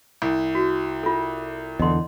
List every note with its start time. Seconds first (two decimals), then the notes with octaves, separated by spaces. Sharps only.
0.22 C2
0.55 F#4
1.03 F4 A4
1.79 E2 D3 D#5 C6